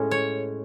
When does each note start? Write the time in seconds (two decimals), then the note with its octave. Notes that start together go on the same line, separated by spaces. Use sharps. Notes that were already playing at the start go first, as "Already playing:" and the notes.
Already playing: A2 G#3 C#4
0.11 C#5